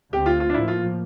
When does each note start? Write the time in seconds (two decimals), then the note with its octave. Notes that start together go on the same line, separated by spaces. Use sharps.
0.13 D2 D3 A3 C4 G4
0.26 F4
0.40 F4
0.50 D4
0.54 A2 F3 A#3 E4
0.68 F4